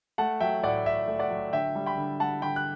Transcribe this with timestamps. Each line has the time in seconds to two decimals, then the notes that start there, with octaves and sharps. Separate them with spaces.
0.18 A3 F#5 A5
0.40 F#3 E5 G5
0.63 A2 D5 F#5
0.86 A2 E5
1.08 A3
1.19 D5 F#5
1.31 F#3
1.53 D3 E5 G5
1.75 G3
1.86 G5 B5
1.98 D3
2.20 G3 F#5 A5
2.42 D3 G5 B5
2.56 F#6